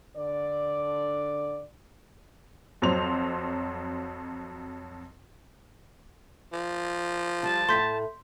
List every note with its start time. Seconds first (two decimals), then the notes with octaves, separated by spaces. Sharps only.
0.17 D3 D5
2.82 F2 F#3 C5 F7
6.53 F3
7.43 G3 F4 A5
7.69 A2 A3 C6 G6 B6